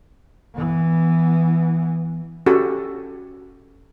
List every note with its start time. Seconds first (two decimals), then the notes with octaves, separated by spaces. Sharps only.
0.55 E3 B3
2.46 C#4 F#4 G4 A4